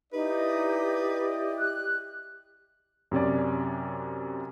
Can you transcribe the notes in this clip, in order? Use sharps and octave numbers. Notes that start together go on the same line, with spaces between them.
D#4 E4 G4 B4 D5 D#5
F#6
F#2 C3 C#4 D5